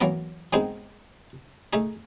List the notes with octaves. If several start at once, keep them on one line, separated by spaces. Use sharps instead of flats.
E3 F#3 A#3 B3 A#4
D#3 G#3 B3 C4 D#4 G#4
A3 D#4 G#4